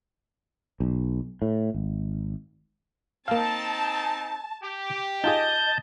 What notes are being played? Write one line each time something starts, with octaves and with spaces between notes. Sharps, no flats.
B1
A2
G#1
A#3 C4 D#4 F5 A5
G4
D#4 F4 G#4 D#5 A5 G6